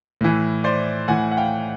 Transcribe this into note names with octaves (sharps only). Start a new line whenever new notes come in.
A2 E3
C5 D5
A2 E3 F#5 G#5
F#5
F5 G5